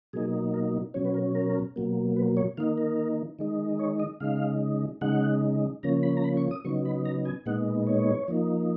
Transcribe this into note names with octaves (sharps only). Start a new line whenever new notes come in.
B2 F#3 A#3 D#4 G#4
A#4
B2 F#3 C#4 C#5
B4
A#4
A#4
B2 F#3 A#3
B4
C#5
D#3 A#3 D#4 F5
A#4
D#3 G#3 D#4
C#5
D#5
C#3 G#3 D#4 F5
C#3 G#3 D#4 F#5
C#3 F3 A#3 C#4 A#5
B5
A#5
B5
C#6
D#6
C#3 F#3 B3 D#4 C#6
B5
A#5
G#5
A#2 G#3 B3 D#4 F#5
C#5
F3 A#3 D#4